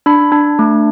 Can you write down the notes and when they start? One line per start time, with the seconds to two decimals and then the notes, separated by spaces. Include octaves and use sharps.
0.06 D4 B5
0.32 D4
0.59 A3